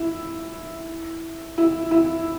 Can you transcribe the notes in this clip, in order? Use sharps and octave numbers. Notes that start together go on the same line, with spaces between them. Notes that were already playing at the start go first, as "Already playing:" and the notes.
Already playing: E4
E4
E4